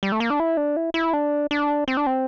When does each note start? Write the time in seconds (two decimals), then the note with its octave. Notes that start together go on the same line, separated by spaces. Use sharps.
0.03 G3
0.12 A3
0.20 A#3
0.30 D4
0.40 E4
0.57 D4
0.76 E4
0.94 E4
1.13 D4
1.51 D4
1.88 C4
1.97 D4
2.06 C4